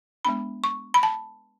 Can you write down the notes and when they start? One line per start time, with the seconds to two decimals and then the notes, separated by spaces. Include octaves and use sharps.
0.25 G#3 B3 D4 B5
0.64 C#6
0.94 B5
1.03 A5